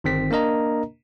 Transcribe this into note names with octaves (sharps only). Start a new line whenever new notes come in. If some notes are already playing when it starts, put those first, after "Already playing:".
G1 D#3 C4 B6
A#3 D4 A#4 D#5 A#5